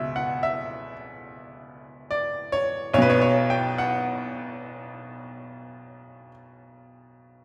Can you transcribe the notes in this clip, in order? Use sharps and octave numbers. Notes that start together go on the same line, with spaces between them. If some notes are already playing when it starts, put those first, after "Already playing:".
Already playing: C#2 B2 E5
F#5
E5
D5
C#5
B1 B2 B4 C#5
C#5
C#5
G5
F#5